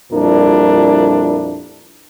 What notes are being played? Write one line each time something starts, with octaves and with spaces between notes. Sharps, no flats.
F2 A#2 G3 D4 E4 A#4